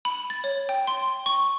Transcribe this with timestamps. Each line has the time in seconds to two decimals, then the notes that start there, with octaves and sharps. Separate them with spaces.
0.05 B5
0.30 A6
0.44 C#5
0.69 G5
0.87 C6
1.26 C#6